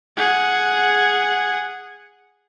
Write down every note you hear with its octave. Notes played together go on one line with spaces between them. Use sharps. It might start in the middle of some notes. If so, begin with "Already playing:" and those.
G#4 F#5